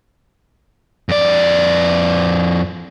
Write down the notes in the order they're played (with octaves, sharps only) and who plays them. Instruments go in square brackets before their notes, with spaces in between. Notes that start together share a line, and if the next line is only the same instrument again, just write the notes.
[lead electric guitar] F2 D5